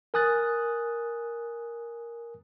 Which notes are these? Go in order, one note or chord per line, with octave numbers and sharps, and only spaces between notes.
A#4 G#5 D#6 F#6 A6